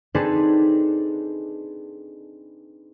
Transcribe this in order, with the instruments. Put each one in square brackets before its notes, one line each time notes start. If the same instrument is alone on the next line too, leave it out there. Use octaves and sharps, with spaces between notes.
[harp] C4 D4 D#4 G#4 A4 B4